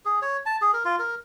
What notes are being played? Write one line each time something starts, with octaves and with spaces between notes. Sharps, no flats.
G#4
C#5
A5
G#4
A#4
F4
A#4